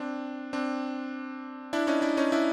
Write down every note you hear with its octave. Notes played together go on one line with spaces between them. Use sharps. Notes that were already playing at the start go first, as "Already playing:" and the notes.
Already playing: C4 D4
C4 D4
D4 E4
C#4 D#4
D4 E4
C#4 D#4
D4 E4